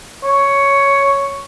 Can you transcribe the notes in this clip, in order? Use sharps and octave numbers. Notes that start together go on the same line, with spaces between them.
C#5